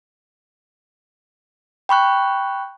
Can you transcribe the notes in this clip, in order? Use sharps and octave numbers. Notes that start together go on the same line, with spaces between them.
G5 B5 C#6 F#6